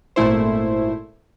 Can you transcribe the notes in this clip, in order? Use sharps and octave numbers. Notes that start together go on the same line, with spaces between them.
G#1 A#2 A3 E4 C5